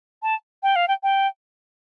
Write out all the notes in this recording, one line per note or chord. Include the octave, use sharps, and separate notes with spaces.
A5
G5
F5
G5
G5